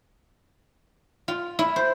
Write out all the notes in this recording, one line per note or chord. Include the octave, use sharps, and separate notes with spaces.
F4
E4
C5